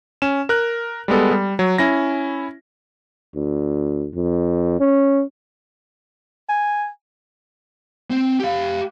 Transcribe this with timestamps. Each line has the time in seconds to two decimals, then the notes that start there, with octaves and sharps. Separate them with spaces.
0.22 C#4 E7
0.49 A#4 F#6
1.08 G3 G#3 B3 A4
1.32 G3
1.59 F#3
1.78 C#4 E4 A#6
3.35 D2
4.15 F2
4.80 C#4
6.49 G#5
8.10 C4
8.40 G4 F5